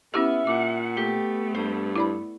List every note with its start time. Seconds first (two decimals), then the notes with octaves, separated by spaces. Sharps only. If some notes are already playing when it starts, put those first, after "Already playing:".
0.14 B3 C#4 E4 G4 E5 F6
0.47 A#2 F#5 D6
0.97 A3 B3 G4
1.55 G2 C5
1.96 E4 D5 B5